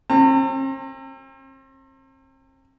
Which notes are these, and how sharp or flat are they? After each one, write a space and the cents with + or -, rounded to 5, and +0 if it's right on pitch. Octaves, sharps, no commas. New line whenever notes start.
C4 +40 A#5 -45